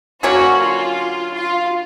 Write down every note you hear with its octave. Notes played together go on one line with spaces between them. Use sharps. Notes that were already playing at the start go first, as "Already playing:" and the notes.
D3 F#3 A#3 C#4 F#4
F4
F4